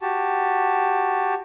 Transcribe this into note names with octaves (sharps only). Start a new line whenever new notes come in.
F#4 G4 A5